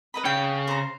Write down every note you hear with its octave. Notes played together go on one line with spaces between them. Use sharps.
B4 D#5 B5
C#3 C#4 G5
C5 A#5